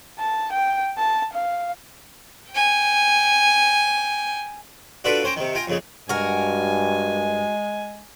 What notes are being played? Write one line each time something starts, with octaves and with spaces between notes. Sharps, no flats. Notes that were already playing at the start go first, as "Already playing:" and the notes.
A5
G5
A5
F5
G5 G#5
D4 F4 F#4 A4 B4 D5
C#4 C5 G5 A#5
C3 D#3
F4 G5 G#5 A#5
F2 C#3 G#3
G2 G#3 F#4 A#4 G#5